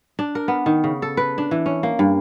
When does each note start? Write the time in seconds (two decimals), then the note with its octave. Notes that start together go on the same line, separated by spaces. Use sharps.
0.19 D4
0.35 A#4
0.48 B3
0.66 D#3
0.84 C#3
1.02 A4
1.17 B4
1.38 D4
1.51 E3
1.66 C#4
1.83 A#3
1.99 G2